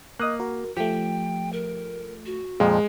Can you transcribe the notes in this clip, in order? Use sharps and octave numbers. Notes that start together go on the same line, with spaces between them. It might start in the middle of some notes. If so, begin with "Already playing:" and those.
A#3 D#5 D#6 F#6
F#4 A#4
F3 A3 G4 G5
A#4
F#4
F2 A#2 F3 G#3